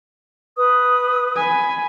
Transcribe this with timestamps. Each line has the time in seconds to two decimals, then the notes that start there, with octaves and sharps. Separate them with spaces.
0.57 B4 D#6
1.36 G#5 B5